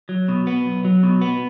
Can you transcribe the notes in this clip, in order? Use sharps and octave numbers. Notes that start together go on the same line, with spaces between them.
F#3
B2
B3
B1
F#3
B2
B3